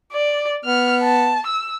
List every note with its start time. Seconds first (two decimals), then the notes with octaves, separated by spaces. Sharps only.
0.13 D5
0.65 B3 F6
1.03 A5
1.46 E6